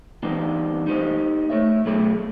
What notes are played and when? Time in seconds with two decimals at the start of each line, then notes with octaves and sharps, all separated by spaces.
0.23 E3 G3 B3 C4 D#4
0.87 D#4 G4 C5 D#5
1.50 A3 C#5 E5
1.85 B1 A3 G#4 B5